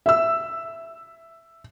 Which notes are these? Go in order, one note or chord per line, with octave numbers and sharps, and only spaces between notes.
E5 E6